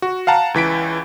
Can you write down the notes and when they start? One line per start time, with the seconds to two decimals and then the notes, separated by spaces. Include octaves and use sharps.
0.02 F#4
0.27 F5 F#5 A5 A#5
0.54 C#2 E3 B6 D7